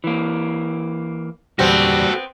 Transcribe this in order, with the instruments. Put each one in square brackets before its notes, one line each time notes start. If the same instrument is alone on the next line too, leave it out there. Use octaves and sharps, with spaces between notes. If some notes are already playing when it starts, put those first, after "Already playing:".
[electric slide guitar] E3 A#3
[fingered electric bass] E2 A#2 D3 [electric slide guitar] G3 [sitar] B3 C4 [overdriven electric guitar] F#4 A4